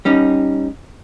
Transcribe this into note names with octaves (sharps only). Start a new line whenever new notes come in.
G3 C#4 D#4